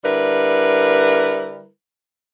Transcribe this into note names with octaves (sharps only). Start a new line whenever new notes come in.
D3 G3 E4 A#4 B4